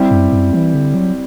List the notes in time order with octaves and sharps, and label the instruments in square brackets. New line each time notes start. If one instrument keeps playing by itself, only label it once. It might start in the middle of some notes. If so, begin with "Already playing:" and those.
Already playing: [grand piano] G3 C4 E4 G4
[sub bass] F#2
F#2
E3
D3
F#3